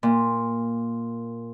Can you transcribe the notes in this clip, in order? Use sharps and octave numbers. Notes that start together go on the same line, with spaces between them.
A#2